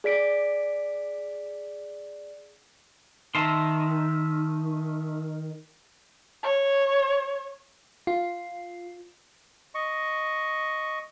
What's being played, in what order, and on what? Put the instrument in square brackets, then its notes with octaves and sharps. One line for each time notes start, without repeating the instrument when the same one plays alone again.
[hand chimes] G#4 D5 B6 D7
[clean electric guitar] D#3 [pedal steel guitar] E5 A5 C6
[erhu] C#5
[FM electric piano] F4
[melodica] D#5 C#6